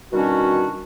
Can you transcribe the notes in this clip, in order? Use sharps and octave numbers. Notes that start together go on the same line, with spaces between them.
B2 D#3 G3 C#4 D4 F#4